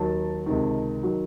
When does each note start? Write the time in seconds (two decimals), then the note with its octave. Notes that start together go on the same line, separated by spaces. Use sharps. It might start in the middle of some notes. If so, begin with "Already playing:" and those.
Already playing: D#2 D#3 F#3 A5
0.46 C#2 C3 D#3
1.03 D#3 F#3